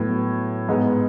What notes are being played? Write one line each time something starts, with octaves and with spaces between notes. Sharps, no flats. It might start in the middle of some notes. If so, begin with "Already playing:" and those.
Already playing: A2 F#3 B3
G#2 G#3 B3